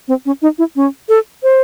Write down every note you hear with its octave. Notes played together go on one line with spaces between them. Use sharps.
C4
C#4
D#4
E4
C#4
A4
C5